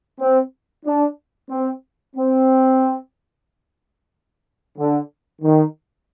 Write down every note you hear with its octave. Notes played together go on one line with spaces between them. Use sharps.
C4
D4
C4
C4
D3
D#3